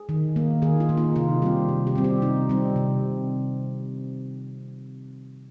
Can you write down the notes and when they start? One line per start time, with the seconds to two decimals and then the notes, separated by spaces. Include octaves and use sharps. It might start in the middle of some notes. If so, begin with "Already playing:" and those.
Already playing: G#4
0.09 D#3
0.36 A#3
0.62 D#3 G#4
0.80 F4
0.89 A#3
0.97 D#4
1.16 C3 F4
1.42 G3 C4 G4
1.69 C3
1.87 G4
1.96 G3 C4
2.04 G4
2.22 C3 D#4
2.49 G3 C4
2.76 C3